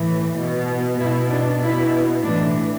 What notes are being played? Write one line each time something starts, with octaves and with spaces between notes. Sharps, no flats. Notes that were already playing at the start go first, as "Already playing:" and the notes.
Already playing: A2 E3
B2
B2 E4
D4
B2 E4
A2 E3 D4